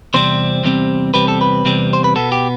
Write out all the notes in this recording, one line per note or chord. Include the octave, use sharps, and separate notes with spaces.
E2 C3 G3 C4 C5
E2 C3 G3 C4
E2 C3 G3 C4 B4
A4
B4
E2 C3 G3 C4
C5
B4
B2 B3 A4
G4